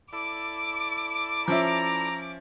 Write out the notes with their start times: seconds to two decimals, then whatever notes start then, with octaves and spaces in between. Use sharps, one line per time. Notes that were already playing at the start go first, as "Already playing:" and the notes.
0.13 E4 A4 D5 D6
1.48 F3 C#4 E5 A#5